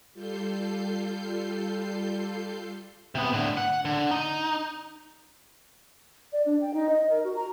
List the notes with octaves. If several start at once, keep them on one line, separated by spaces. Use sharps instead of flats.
G3 F4 A4 G6 C7
C3 B3
A2 D3
F#5
D3
D#4
D5
D4
G5
D#4
D#5
A#4
F#4
A#5